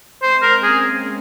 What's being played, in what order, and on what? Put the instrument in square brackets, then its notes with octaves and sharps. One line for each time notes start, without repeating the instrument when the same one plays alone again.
[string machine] G#3 C4 [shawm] C5
[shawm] A#4
[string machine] A#3 C#4 [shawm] G#4